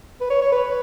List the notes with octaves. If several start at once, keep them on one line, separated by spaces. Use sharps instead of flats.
B4
C#5
C#5
B4